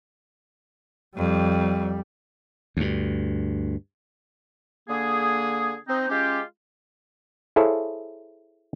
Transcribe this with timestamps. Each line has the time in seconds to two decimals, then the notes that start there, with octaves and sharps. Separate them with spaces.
1.16 F2 G3
2.77 D2 G2
4.89 D3 A#3 G#4
5.88 C4 D#4
6.09 G#3 C#4 F4 G4
7.56 E4 G#4 A4 C5 C#5 F5